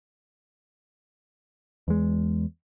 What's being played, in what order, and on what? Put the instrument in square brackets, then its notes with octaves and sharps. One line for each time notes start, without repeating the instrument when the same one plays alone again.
[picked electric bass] E2 G#3